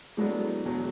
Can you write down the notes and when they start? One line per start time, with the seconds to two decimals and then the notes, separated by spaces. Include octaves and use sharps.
0.17 A2 F#3 G#3 B3 D4
0.65 E2 B2 F#3